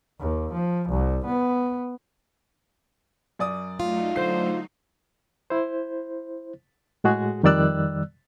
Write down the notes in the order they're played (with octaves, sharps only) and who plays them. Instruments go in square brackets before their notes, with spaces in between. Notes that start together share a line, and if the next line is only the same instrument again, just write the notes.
[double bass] D#2
F3
C2
B3
[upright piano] F#2 D5 D#6
[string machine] F#3 A3 D#4 [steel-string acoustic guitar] F4
[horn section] D3 C5 [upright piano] C7
[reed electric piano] E4 C5
A2 G#3 F#4 G#4
F2 D#3 G3 D5 E6 F#6